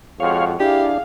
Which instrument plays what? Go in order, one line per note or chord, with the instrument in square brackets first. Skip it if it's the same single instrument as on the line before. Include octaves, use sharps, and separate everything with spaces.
[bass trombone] F2 [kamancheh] G#3 F#4 [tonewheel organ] C#5 F5
[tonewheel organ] D4 [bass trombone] E4 [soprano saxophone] G4 [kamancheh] G#4 F5